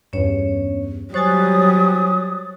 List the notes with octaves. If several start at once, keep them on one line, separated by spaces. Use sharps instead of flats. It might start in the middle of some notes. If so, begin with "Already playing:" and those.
E2 G2 C#4 C#5
F#3 G3 C5 C#5 G#5 D#6 F#6 A6